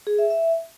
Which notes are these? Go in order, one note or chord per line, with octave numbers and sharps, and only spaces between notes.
G#4
E5
E5